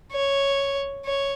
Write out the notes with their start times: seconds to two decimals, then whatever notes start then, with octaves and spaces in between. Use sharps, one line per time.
0.13 C#5
1.05 C#5